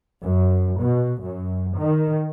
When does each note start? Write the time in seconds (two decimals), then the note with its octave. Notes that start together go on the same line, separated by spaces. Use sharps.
0.21 F#2
0.80 B2
1.22 F#2
1.77 D#3